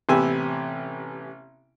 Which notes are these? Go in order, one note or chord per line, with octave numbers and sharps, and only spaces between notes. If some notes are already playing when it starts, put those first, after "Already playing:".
A1 C3 B3 G4 G#5 E6